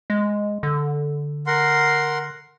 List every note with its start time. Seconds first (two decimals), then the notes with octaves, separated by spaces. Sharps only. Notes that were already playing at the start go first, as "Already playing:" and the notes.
0.10 G#3
0.63 D3
1.47 A#4 F#5 C6